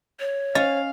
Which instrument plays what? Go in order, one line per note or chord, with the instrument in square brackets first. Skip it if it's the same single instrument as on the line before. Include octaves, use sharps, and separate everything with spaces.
[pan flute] C#5
[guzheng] C#4 [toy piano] D#5 [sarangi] F5